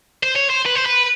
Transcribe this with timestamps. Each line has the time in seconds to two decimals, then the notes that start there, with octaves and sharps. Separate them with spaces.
0.23 C5
0.36 C#5
0.50 C5
0.66 B4
0.76 C5
0.86 B4